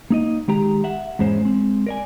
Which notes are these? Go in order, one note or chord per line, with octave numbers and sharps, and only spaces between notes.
A#3 D#4 D#5
D#3 G#3 G4 A#5
E5 F#5
E2 G#2 G#3 C#4 C5
G#3 C4
A#4 D5 G#5